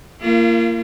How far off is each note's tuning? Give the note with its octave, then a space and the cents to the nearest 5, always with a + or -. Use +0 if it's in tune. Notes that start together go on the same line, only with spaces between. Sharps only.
A#3 -20 F4 -40